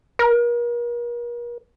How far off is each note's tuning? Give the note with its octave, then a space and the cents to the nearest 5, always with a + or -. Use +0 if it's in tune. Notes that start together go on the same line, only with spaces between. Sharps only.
A#4 +40